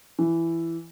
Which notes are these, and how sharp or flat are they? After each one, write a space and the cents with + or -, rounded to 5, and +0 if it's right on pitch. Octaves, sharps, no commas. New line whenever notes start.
E3 +10